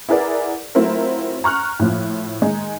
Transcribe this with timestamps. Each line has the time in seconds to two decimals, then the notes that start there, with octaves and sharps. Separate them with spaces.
0.09 E4 G#4 A#4 B4 D5 F#5
0.75 F#3 A3 C4 E4 F4 A#4
1.44 A#5 C#6 F6 F#6
1.79 A2 F3
2.42 D#3 G#3 D#4